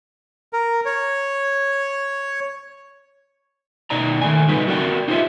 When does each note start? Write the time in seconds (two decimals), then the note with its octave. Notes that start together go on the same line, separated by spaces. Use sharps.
0.53 A#4
0.85 C#5
3.90 B2 D#4 D5 A#5
4.21 D#3 A3 G#5
4.48 C#3 F#3 G#3 D#4 B4
4.68 F#4 A#4 D5 G5
5.08 D#4 F4 G4 C5 C#5 E5